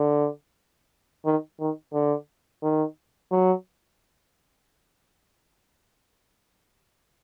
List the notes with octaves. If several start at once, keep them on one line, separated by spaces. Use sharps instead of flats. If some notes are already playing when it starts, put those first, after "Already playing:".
Already playing: D3
D#3
D#3
D3
D#3
F#3